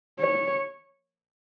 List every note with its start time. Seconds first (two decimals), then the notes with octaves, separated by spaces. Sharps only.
0.19 C#5